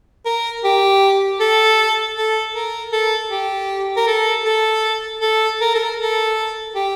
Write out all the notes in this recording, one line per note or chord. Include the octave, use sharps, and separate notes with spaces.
A#4
G4
A4
A4
A#4
A4
G4
A#4
A4
A4
A4
A#4
A4
A#4
A4
G4